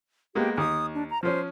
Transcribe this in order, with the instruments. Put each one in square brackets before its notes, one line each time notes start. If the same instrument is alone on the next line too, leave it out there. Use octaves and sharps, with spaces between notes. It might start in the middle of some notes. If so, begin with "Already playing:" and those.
[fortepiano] G#3 A#3 B3 [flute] G4
[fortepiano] D#2 [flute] D#6
[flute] D4
A#5
[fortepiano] F3 C#4 [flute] C5